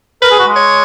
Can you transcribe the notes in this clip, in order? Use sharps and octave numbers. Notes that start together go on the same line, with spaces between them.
A#4 B4
G#4
F#4
G#3
C#5